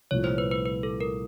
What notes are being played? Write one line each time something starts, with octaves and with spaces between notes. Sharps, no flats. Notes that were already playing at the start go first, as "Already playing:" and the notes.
C2 A#2 F3 A3 C#5
C5
B4
B4
B4
A4
A#4